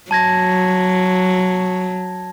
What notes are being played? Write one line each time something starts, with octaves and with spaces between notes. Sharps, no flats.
F#3 A5 G#6 A#6